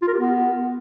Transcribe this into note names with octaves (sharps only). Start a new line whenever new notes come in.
F4
A#4
G4
B3